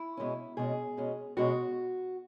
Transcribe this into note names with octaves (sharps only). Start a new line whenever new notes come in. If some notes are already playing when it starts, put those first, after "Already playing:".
Already playing: E4
B2 G#3 C#4
B2 G#3 C#4 G#4
B2 G#3 C#4
B2 G#3 C#4 F#4